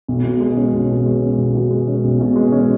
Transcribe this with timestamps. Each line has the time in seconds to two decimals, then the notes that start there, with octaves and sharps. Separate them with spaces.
0.08 B1
0.24 B2
0.41 G#3
0.57 C#4
0.73 B1
0.89 B2
1.06 G#3
1.22 C#4
1.38 B1
1.55 B2
1.71 G#3
1.88 C#4
2.04 B1
2.20 B2
2.36 G#3
2.52 C#4